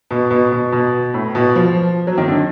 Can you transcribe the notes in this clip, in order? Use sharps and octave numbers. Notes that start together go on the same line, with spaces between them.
B2
B2
B2
B2
A2
B2
F3
F#3
D#3
D3